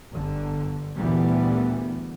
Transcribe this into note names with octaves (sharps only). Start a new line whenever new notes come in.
G1 D3
D2 A#2 E3 G3 B3